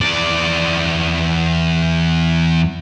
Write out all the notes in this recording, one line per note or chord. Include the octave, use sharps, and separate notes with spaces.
E2 D5